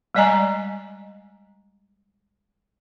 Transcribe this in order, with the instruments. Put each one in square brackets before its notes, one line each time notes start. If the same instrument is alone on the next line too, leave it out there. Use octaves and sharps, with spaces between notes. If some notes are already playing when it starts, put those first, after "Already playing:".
[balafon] G3 G#3 D5 D#5 G#5 A#5